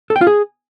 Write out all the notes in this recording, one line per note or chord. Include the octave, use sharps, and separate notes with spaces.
A4
G5
F4
G#4